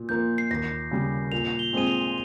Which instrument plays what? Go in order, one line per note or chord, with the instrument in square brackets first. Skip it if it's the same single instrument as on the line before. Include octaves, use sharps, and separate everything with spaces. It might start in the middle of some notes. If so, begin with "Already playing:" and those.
Already playing: [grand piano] A#2
[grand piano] F3 A#3 F4 A#4 [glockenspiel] G6
[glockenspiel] C7
[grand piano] D#2 [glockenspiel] A#6
[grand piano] C#3 G3
[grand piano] A#2 [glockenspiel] F7
[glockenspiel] G7
[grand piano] G#3 C4 F4 G#4 [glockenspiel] D#7
[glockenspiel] F7